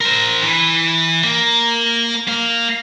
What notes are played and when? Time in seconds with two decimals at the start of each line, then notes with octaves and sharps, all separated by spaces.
0.01 A#4 C5
0.43 E3
1.24 A#3
2.28 A#3 F5